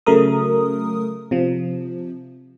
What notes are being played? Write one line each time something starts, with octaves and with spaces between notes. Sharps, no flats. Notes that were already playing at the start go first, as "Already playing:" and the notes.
C#3 F#3 A3 A#4 D#6
C3 F3